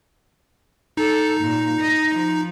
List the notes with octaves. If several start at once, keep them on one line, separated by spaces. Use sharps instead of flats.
D#4 A4
A#2
D#5
F3